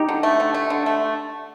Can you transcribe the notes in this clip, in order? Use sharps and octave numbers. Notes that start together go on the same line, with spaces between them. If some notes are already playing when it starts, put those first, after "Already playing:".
Already playing: D#4 G4
D3
A3
D3
A3
D3
A3